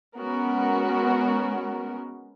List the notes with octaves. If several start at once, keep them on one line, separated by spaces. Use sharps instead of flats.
G#3 B3 C#4 F#4 A#4